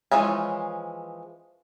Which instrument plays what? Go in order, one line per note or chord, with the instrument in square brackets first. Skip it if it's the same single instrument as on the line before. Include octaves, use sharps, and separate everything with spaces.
[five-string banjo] E3 F3 G#3 C#4